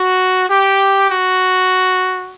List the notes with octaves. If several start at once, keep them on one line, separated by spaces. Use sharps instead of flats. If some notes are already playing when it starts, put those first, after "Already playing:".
Already playing: F#4
G4
F#4